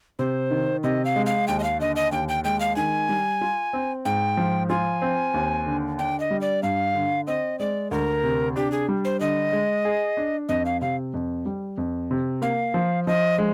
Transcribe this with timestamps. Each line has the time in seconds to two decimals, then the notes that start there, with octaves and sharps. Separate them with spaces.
0.19 C3 C5
0.51 D#3
0.84 C3 D#5
1.05 F5
1.16 G#3
1.26 F5
1.48 D#2 G5
1.60 D#5
1.63 F5
1.80 D3 D#5
1.96 D#5
2.12 D#2 G5
2.29 G5
2.44 G#3 G5
2.60 F5
2.76 D#3 G#5
3.09 G3
3.41 F4
3.73 C4
4.05 G#2 G5
4.37 F3
4.69 F4 G#5
5.02 C4
5.34 D#2
5.66 D3
5.98 D4 G5
6.20 D#5
6.31 G3
6.41 D5
6.63 G2 F5
6.95 D3
7.27 C4 D#5
7.59 G#3 D5
7.91 D2 A#4
8.24 C3
8.56 D4 G4
8.72 G#4
8.89 G3
9.05 C5
9.20 D3 D#5
9.52 G#3
9.85 G#4
10.17 D4
10.49 F2 D#5
10.65 F5
10.81 C3 F5
11.14 F2
11.46 G3
11.78 F2
12.11 C3
12.42 A#3 F5
12.74 F3
13.07 F3 D#5
13.38 G#3